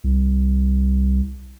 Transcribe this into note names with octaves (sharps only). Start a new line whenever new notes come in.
C2